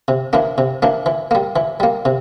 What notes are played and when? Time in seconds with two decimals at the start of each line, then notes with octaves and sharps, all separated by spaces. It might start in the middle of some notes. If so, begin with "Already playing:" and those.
0.08 C3
0.33 E3 A#3 D4
0.58 C3
0.82 E3 A#3 D4
1.06 E3
1.31 G3 A#3
1.56 E3
1.80 G3 A#3
2.05 C3